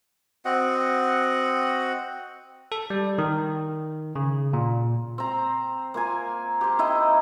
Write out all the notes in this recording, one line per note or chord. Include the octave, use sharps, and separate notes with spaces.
C4 F#4 D#5 F#5
A4
G3
D#3
C#3
A#2
C4 A#5
A#3 F4 G#5
G4 C5
D#4 E4 D#5 G5